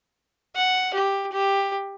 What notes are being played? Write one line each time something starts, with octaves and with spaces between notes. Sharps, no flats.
F#5
G4
G4